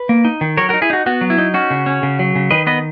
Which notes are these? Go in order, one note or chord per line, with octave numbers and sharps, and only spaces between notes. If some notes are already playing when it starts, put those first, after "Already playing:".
Already playing: B4
A#3
D#4
D#3
F#3 A#4 C#5
F#4 A#4
D#4
E4 G#4
D#4 F#4
B3 F#4
F#3
E4
D#4
C#4 F#4
C#3
C#4
C#3
F#3
C#3
D#3 B4 D#5
B3 B4 D#5